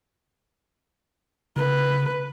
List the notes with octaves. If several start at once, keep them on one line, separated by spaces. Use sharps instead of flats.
C#3 B4